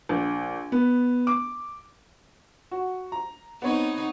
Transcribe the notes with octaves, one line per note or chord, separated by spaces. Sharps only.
A#1
B3
D6
F#4
A#5
B3 C4 D#4 C#5